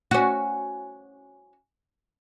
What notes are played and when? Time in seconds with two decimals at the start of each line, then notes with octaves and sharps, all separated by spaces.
0.11 C#4 F#4